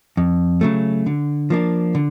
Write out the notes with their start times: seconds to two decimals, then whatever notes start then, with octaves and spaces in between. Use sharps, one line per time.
0.17 F2
0.61 C#3 F#3 A3
1.06 D3
1.50 F3 A#3 D4
1.95 D3